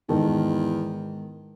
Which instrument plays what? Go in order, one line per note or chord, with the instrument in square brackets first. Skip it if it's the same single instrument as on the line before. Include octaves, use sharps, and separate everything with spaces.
[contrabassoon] E2 [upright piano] G#2 D#3 A5